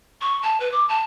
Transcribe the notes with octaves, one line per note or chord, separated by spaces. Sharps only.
C#6
A5
B4
D6
A5